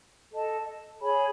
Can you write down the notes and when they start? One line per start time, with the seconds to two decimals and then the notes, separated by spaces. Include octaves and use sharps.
0.31 A4 D#5 A5
1.01 G#4 C#5 G#5 B5